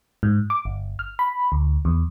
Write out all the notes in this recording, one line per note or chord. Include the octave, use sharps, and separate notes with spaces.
G#2
D6
G1
F6
B5
D2
E2